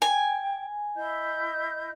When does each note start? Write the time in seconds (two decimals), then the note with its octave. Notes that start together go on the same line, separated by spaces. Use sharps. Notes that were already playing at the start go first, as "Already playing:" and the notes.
0.02 G5 G#5
0.96 E4 D#5 G6